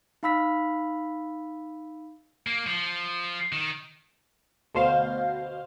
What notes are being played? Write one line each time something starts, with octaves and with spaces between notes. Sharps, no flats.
D#4 F5 B5 E6 B6
A#3
F3
D#3
D2 B2 C5 F5